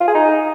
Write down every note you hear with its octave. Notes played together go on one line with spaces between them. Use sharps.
F4
G#4
D#4